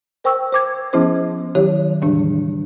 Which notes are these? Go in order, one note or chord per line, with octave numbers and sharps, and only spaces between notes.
A#4 C5 G5 C#6 E6
C5 D6 G#6
F3 B3 C#4 E4 G#4 C5
D#3 F#3 E4 G4 C#5
E2 A2 C#3 E3 G3 D4